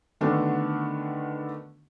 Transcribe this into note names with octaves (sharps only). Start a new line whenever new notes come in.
D3 D#3 A3 B3 D4 F#4